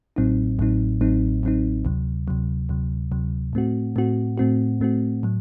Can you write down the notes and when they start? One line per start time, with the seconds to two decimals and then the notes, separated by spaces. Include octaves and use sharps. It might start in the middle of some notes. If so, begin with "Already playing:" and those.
0.16 A1 A2 F#3 C4 D#4
0.59 A1 A2 F#3 C4 D#4
1.01 A1 A2 F#3 C4 D#4
1.43 A1 A2 F#3 C4 D#4
1.85 D2 C3 F#3
2.28 D2 C3 F#3
2.69 D2 C3 F#3
3.12 D2 C3 F#3
3.53 A2 A3 C4 F#4
3.96 A2 A3 C4 F#4
4.38 A2 A3 C4 F#4
4.81 A2 A3 C4 F#4
5.23 A2 F#3